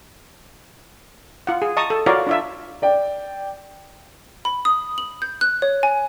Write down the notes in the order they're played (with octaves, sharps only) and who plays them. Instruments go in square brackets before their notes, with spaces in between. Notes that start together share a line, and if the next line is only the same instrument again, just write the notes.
[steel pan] F4 F#5
G#4
D#5 A5 A#5 C#6 D#6
A4
F4 F#4 A#4 C#5 D5 F5
D4 F4 E5
[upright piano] D5 G5
[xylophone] B5
D#6
F#7
G6
F#6
C#5
G#5